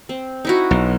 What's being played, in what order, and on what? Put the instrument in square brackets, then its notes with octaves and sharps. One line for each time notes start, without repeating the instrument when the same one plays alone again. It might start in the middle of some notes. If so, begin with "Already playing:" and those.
[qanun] C4
D#4 E4 F#4
[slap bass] B1